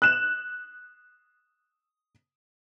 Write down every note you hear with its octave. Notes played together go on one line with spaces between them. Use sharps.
F#6 E7